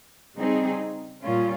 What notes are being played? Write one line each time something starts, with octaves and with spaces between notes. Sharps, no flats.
C#3 G3 C4 D#4 G#4
A#2 G3 C#4 F4